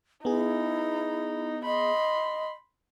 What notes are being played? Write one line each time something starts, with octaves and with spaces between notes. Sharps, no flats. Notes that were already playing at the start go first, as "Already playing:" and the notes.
B3 D#4 E4 G#4
D#5 B5 C6